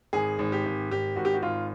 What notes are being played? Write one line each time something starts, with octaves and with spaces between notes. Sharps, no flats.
G#1 G#4
G#1
G4
G#1
G#1 G4
G#1 F#4
G4
F#4
G#1 F4